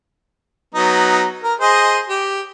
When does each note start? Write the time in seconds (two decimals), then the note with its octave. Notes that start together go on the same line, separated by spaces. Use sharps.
0.75 F#3 B3 D#4
1.43 A#4
1.60 G#4 C5 D#5
2.09 G4